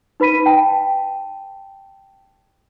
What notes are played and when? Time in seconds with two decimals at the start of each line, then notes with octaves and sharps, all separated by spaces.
0.20 D#4 B4 B5 B6 D#7
0.46 G5 A5